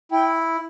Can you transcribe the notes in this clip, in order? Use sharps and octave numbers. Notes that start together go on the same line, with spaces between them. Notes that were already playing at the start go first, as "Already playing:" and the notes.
E4 G5